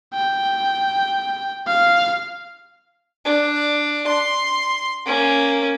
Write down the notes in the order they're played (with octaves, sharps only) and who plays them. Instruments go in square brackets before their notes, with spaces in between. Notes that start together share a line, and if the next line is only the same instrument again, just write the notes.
[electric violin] G5
F5
[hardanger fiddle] D4
C6
A#3 C#4